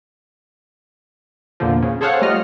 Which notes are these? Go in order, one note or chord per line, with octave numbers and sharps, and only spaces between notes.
E2 A#2 D3 F3
C#3
G#4 A4 C5 C#5 F5 F#5
G3 A3 F4 D#5 F6